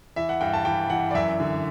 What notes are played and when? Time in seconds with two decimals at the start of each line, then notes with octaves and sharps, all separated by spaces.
0.16 E3 E5
0.29 F#5
0.41 G2 G5
0.54 A5
0.65 E3 G5
0.90 E3 F#5
1.11 D5
1.15 F#2 E5
1.40 D3